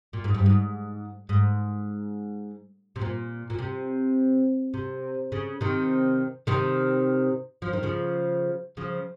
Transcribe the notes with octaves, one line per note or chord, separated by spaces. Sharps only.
A#2
G#2
G2
G#2
G#2
C3
A#2
A#2
C3
C3
C#3
C3 D#3
C3 D#3
F3
D#3
C#3 F3
C#3 F3